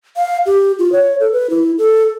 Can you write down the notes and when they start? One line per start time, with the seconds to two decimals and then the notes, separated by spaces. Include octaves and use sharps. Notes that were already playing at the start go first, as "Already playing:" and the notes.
0.17 F5
0.46 G4
0.79 F4
0.92 C#5
1.20 A4
1.33 B4
1.50 E4
1.78 A4